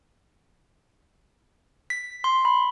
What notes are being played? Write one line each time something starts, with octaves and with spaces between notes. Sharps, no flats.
B6
C6
B5